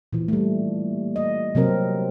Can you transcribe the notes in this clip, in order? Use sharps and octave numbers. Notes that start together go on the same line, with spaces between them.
A#2 E3
G3 A3
D#5
C3 F#3 C4 A#4